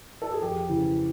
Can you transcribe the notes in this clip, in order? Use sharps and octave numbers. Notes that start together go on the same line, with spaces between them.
A4
G#4
F2 G4
C#3 E3